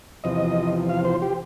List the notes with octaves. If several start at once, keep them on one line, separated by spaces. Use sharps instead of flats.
E2 C3 F3 D#5
F5
C5
G4